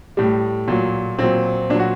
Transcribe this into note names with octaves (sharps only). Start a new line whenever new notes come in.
A2 G3
A#2 F#3
A#2 F#3 C4
A#2 F#3 D4 F#4